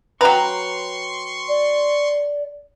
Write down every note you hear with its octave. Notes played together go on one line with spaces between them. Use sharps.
F#3 B4 G5 A#5 C6 C#6
D5